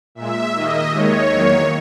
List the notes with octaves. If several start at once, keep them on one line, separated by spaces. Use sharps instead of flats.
A#2 G#3 E5
D#2 D#3 A#3 D#5
D#2 D#3 G#3 C#5
E2 D#3 F#3 A#3